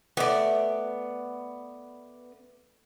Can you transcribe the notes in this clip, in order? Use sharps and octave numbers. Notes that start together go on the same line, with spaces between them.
A3 B3 D5